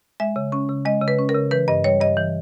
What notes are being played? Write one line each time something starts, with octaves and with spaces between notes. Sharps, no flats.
G#3 E5
C#3
C#4
C#3
G#3 D#5
C#3
B4
C#4
A#4
C#3
E3 B4
G2 D#5
G3 C#5
G2 D#5
E3